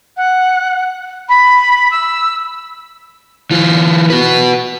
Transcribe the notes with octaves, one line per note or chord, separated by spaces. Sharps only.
F#5
B5
E6
E3 F4
F#4 B4